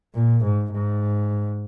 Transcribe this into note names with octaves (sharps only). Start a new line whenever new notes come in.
A#2
G#2
G#2